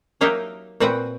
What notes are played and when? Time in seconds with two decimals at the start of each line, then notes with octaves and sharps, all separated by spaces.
0.21 F#3 A#3 D#4 G4 A#4 E5
0.80 A#2 C4 F#4 B4 F#5 G5